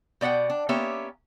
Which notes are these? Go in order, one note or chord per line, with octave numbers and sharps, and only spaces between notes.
B2 D5 D#5 F#5 G5
D4
A#3 B3 C#4 G4 C#5 E5